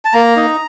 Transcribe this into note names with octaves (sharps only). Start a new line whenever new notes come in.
A5
A#3 A#5
D#4